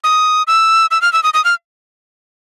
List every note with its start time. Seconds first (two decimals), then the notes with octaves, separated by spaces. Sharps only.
0.04 D#6
0.47 E6
0.91 E6
1.02 F6
1.13 E6
1.23 D#6
1.34 D#6
1.45 F6